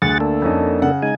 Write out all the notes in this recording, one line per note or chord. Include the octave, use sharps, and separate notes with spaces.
D2 G#4 F#5 A6
A#3 D4 A4
F2 C#4 D#4
C#3 F#5
G#3 D#4 G#5